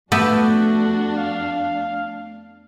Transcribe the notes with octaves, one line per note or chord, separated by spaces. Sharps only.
F2 A3 B3 D4 F#4 G4 E5
F5